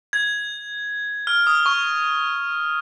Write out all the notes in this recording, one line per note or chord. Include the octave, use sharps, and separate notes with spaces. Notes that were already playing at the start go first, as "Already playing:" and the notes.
G#6
F6
D#6
C#6